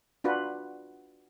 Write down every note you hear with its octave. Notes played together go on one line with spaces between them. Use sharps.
D4 F4 F#4 B4